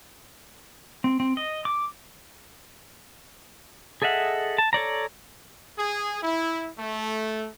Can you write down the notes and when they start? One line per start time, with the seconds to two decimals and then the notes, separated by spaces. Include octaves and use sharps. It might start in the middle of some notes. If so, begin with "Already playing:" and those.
1.04 C4
1.20 C4
1.37 D#5
1.65 D6
4.02 G#4 A4 D#5 E5 F#5
4.58 A5
4.73 A4 C#5 D5 A#5
5.78 G#4
6.23 E4
6.78 A3